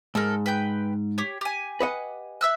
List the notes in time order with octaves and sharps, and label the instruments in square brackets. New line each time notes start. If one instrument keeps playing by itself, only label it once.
[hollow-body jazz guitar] G#2 [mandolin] A4 A#4
[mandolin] B4 G5 G6
G4 C#5
G4 G#5
[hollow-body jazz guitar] B4 D#5 F#5
[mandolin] E5 E6 F#6